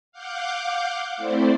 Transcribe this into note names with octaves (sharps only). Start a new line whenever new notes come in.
F5 F#5 D6 G6
A3 C4 E4 C5 D5